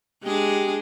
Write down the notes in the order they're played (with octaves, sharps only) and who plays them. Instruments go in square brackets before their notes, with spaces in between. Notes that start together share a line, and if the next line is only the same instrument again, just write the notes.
[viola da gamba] G#3 D4 G#4 [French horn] G4